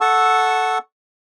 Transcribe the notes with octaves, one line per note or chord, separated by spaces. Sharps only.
A4 F#5 A5 C#6 E6